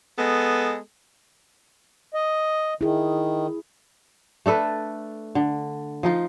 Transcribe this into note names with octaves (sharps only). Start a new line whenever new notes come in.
G#3 B3 A4
D#5
D#3 E4 G#4
A3 D4 A4 B4
D3
F3 D#4 F4